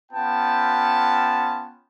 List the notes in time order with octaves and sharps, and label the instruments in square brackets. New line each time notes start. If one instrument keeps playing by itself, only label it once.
[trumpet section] B3 C#4 F4 G5 A5